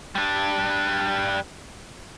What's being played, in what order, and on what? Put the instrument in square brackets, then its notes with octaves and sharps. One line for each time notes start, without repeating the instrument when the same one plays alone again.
[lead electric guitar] G3 D4